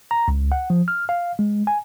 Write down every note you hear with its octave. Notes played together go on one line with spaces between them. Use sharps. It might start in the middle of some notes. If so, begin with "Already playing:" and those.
A#5
C#2
F#5
F3
F6
F5
G#3
G#5